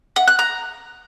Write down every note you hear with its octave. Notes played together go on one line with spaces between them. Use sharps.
F#5
F#6
A#5